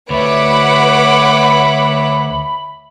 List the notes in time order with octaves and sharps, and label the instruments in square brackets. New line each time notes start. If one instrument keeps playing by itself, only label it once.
[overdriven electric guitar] D2 [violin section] B4 F#5 D6 [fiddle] C#5 E5 [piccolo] B5